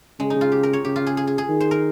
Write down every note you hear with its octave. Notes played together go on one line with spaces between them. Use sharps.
C#3 G#3
D#4
C#3
F4
G4
A#4
C#5
C#3 G4
F4
G#4
G#4
G#4
G#4
D#3
C5
A#4